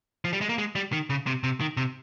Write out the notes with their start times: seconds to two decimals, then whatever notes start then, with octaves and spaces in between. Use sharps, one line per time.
0.25 F3
0.33 G3
0.41 G#3
0.49 A#3
0.58 G#3
0.75 G3
0.92 D#3
1.10 C#3
1.27 C3
1.44 C3
1.61 D#3
1.77 C3